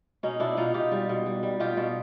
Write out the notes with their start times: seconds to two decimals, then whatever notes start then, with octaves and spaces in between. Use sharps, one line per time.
0.23 B2 C#4 D#4
0.40 B2 D4 E4
0.57 B2 D#4 F4
0.74 B2 F4 G4
0.92 G3
1.09 B2
1.26 G3
1.43 G3
1.60 B2 F4 G4
1.77 B2